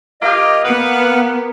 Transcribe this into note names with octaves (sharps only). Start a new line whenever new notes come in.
A#3 F4 G4 D#5
B3 B4 F5 F#5